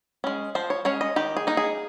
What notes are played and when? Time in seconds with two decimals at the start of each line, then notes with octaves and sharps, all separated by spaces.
0.24 G#3 C#4
0.55 F3 C5
0.70 C#5
0.85 G#3 C#4 C#5
1.01 D#5
1.16 D#3 G4
1.37 G#4
1.47 A#3 D#4
1.57 G#4